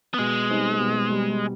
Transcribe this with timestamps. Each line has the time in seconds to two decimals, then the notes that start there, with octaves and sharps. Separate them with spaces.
0.14 B3
0.18 B2 G#3
0.50 G3 C4 D#4
0.79 B2
1.10 G3